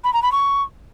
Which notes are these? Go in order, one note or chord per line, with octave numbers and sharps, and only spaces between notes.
B5
A#5
B5
C#6